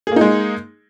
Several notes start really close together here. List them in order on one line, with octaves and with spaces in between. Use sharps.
G#4 A#3 D#4 G#3